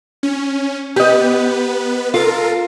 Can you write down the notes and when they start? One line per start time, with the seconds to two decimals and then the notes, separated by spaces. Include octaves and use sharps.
0.23 C#4
0.96 B3 G4 B4 D#5
2.14 F4 A4 A#4